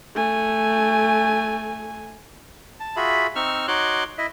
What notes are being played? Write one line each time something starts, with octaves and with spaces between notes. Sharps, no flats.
A3 G#5
A5
F4 F#4 G#4 E5 B5
C4 D#4 C#6 E6 F6
D#4 F#4 C#5 C6 D6 F#6
E4 D#5 E5